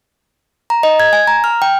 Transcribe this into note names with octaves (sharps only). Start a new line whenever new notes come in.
A#5
D#5
G#6
G#5
A#5
F6
G5